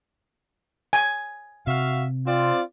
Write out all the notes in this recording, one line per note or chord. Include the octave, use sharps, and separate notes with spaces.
G#5
C3 F#4 E5 F5
C4 F4 D5